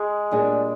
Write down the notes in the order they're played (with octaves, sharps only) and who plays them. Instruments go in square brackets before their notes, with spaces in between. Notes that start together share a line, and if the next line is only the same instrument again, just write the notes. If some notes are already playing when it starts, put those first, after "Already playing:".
Already playing: [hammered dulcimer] G#3
[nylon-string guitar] A#2 G3 D4 G#4